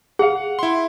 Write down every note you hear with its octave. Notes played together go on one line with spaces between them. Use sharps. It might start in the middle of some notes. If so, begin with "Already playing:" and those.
G#4 F5 F#5
E4 C6